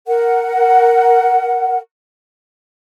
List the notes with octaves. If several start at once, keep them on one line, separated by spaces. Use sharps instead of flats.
A#4 F#5